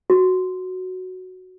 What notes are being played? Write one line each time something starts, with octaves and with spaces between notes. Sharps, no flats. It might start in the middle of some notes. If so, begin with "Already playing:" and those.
F#4